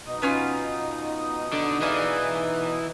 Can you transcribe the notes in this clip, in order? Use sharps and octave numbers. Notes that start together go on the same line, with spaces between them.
B2 D#4 D#6
B3 C#4 F4
D3
E3 G#4 D5 F5